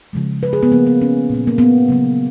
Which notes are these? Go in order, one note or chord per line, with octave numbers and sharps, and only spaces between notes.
C#3 F3 G#3
B4
G#4
B3
C#3 F3 A#3
B3
C#4
A#2 F#3 A#3
A#3
B3
C#3 F#3 A#3